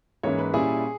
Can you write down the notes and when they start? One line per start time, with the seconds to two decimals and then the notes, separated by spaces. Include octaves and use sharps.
0.23 G#2 E3 A#3 C#4 E4 C#5
0.38 B4
0.53 A#2 G3 C#4 E4 G#4